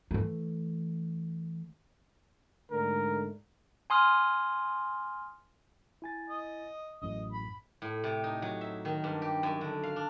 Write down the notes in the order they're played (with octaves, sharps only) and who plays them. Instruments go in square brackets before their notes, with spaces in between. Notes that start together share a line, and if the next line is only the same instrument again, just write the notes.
[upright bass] E3 A3
[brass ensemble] G#2 D3 A3 [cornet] A#4
[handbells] G#5 C6 D#6 F6
[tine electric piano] E4 G#5 A6
[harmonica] D#5
[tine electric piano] A1 F#2 A2 [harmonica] D#5
[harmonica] B5
[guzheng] A2
C3
D#4
F#3
E5
D#3
G2
G4
F#2
D3
F5
D4